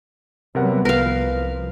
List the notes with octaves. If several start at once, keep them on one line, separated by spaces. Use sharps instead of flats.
C3 F#3 G3 B3 A#4 F#5
C2 F3 A#4 B4 F5